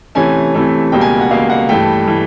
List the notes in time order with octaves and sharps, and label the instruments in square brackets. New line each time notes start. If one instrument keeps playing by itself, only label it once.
[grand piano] C3 E3 A3 C#4 G#5
C3 E3 A3 C#4
C#2 B2 G3 A#3 G5
G#5
F#5
C#2 B2 G3 A#3 F5
F#5
G2 E3 A3 G5
E3 A3